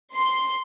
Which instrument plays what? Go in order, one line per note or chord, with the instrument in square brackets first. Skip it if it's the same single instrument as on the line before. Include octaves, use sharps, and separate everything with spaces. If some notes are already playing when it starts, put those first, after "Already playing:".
[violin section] C6